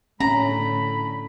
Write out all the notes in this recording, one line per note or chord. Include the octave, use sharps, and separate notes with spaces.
A2 D3 A3 C#4 A#5 B5